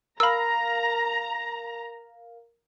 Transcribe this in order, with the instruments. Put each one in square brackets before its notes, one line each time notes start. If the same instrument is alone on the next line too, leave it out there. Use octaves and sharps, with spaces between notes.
[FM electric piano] A#4 F5 [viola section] A#5 [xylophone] B5 E6